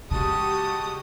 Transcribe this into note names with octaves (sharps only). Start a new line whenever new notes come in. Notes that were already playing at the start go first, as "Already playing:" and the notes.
C#3 G#3 F#4 G4 A5 D#6